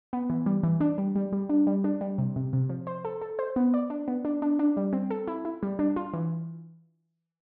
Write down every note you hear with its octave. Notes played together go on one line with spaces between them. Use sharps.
B3
E3
G3
E3
D4
G3
G3
G3
D4
G3
D4
G3
C3
C3
C3
F3
C5
A4
A4
C5
B3
D5
D4
B3
D4
D4
D4
G3
C4
A4
E4
E4
G3
D4
F4
E3